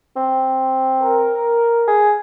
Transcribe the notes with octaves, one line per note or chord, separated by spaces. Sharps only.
C4
A#4
G#4